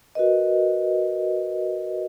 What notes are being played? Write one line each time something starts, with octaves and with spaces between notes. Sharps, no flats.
F#4 A#4 B4 D#5